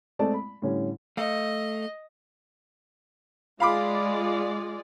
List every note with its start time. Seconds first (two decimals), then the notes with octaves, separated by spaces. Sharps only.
0.19 G#3 A3 C4 D5 A5
0.34 B5
0.62 A2 D3 G3 C#4
1.17 A3 D#5 F5
3.60 G#3 F4 D5 F5 B5 D6